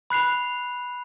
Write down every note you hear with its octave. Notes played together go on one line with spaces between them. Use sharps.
B5 F#6 C7 F7